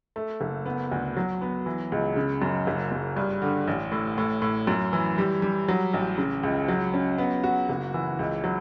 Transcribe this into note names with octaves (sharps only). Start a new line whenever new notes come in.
A3
F#1
B3
D2
F#3
B3
E3
C#2
C#3
F#2
F#1
F#2
G2
D3
A1
A2
A2
A2
F#2
E3
G3
G3
F#3
A1
C#3
C#2
F#3
C#4
B3
F#4
F#1
E3
C#2
F#3